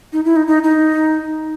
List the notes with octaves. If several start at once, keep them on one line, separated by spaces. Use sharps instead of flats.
D#4
E4
D#4
D#4
D#4